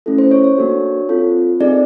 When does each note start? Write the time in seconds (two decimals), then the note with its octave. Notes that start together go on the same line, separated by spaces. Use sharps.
0.06 A3 C#4 E4 A4
0.18 C5
0.31 C#5
0.44 C#5
0.57 A#3 D4 F#4 A4
1.09 C4 F4 A4
1.60 C4 D#4 G#4 D5